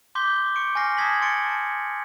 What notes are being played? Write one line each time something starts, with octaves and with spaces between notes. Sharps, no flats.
C6 D6 G6 B6 G7
C#6 D6 C#7 D7
G#5 C#6 F6 A#6 C7 C#7
A5 C#6 D#6 G#6 B6 F#7
C6 C#6 F6 A6 C#7 D7
A5